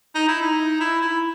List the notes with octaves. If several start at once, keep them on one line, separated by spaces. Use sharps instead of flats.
D#4
E4
D#4
E4
E4